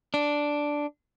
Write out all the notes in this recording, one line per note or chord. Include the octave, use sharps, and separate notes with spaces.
D4